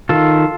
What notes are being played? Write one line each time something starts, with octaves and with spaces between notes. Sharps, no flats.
D#3 F4 A4